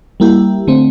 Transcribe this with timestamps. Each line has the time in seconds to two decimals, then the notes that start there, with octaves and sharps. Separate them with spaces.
0.20 G3 A#3 E4 G4
0.67 D3 A3 C4